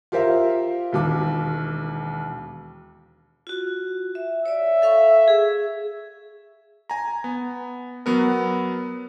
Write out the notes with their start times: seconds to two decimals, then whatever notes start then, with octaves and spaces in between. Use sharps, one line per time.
0.12 F4 G4 A#4 C5 E5 F5
0.92 E1 D#2 D6
3.47 F4 F#4
4.15 E5
4.46 C#5 D5 E5
4.82 A4 F5 C#6
5.28 G#4
6.90 G#5 A#5
7.24 B3
8.06 F#3 B3 A#4